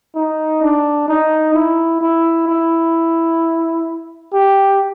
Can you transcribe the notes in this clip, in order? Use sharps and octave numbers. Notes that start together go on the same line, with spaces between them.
D#4
D4
D#4
E4
E4
E4
G4